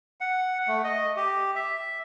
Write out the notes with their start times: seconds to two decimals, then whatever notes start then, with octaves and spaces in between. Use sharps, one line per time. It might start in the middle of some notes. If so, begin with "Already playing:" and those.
0.21 F#5
0.68 A3
0.84 D#5
1.17 G4
1.55 E5